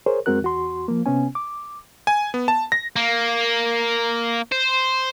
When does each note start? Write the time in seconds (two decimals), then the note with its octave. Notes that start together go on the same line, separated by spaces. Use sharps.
0.06 G#4 A#4 C5 C#5
0.26 F#2 G#3 C4 F#4 A#4 F#6
0.42 E2 F#4 C6
0.88 F3 A#3
1.06 C3 B3 C#4 G#5
1.35 D6
2.07 G#5
2.34 B3
2.48 A5
2.72 A#6
2.96 A#3
4.52 C5